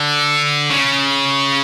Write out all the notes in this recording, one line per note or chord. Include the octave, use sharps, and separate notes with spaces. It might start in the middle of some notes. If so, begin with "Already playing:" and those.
Already playing: D3
C#3